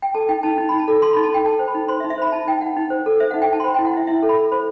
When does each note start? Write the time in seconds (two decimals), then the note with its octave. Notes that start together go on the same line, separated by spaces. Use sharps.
0.02 G5
0.14 A4 A5
0.29 D#4 G5
0.43 D#4 A5
0.58 D#4
0.69 D#4 B5
0.79 A5
0.88 A4
1.02 A4 C6
1.13 D#4 B5
1.23 A5
1.30 D#4 G5
1.45 A4 A5
1.59 C5
1.68 B5
1.75 D#4
1.88 C5 C6
2.00 E5
2.04 D#4
2.10 E5
2.18 C5 B5
2.32 D#4 A5
2.47 D#4 G5
2.61 D#4 F#5
2.77 D#4
2.90 C5
3.06 A4
3.20 C5 E5
3.31 D#4 F#5
3.42 G5
3.49 D#4 A5
3.60 C6
3.64 C5 B5
3.74 E4 G5
3.86 F#5
3.93 E4 E5
4.07 E4 E5
4.23 A4
4.29 B5
4.36 A4
4.52 C5 B5